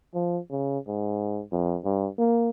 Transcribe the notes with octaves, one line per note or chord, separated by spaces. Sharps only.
F3
C#3
G#2
F2
G2
A#3